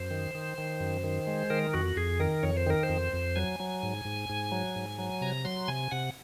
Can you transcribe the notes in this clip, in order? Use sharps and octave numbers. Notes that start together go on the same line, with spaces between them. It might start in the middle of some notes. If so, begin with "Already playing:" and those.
Already playing: F#2 C5
D#3
D#3
D#3
F#2
D#3
G#3
D#3 A#4
F2 F#4
F2 G#4
D#3 A#4
F2 C#5
C5
D#3 A#4
C5
F2
F2
F#3 G#5
F#3
G#2
G#2
G#2
F#3
G#2
F#3
C3 A#5
F#3 C6
C3 G#5
C3 F#5